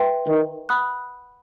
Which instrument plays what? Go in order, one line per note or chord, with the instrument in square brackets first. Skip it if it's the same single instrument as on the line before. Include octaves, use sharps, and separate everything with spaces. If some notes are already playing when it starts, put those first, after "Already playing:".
Already playing: [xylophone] B4 E5 G5 C6
[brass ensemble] D#3
[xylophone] F#5 B5 D#6 F#6